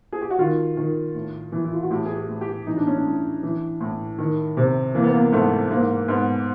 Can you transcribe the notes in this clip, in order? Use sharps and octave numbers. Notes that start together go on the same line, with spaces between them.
G#4
G4
F#4
D#3 F4
D#3
A2
E3
E4
F4
F#4
A2 G4
G#4
G4
A2
G4
E3 D#4
D4
C#4
D4
A2
E3
A2
D#3
C3
E3 A#3
B3
A#3
G#2 A3
G#2 A#3
G#2 B3